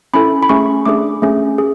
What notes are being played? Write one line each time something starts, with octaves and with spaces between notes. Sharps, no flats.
C#4 E4 A4 B5
B5
A3 C#4 G#4 C#6
A3 D4 G#4 D6
A3 C#4 G#4
G#4